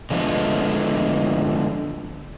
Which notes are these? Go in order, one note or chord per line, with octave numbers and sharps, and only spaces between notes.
D3 F3 G#3 A3 B3